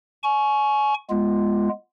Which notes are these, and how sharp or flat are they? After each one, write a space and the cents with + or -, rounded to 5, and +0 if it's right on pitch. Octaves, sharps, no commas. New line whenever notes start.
G#5 +30 C#6 +0
G#3 +0 B3 -15 F4 -10